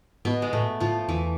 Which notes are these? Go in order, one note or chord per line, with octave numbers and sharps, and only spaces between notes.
G#2 B2 B3
G#3
A2 A3
G#2 F3 F4
E2 E3 E4